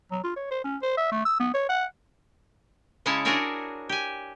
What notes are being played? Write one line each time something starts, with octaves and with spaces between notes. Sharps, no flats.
F#3
F4
C#5
C5
C#4
C5
E5
A3
E6
B3
C#5
F#5
C#3 G#3 C#4 E4 C#5 A5
D4 F#4 G#4 A#4 C#5 E5
G4 G#5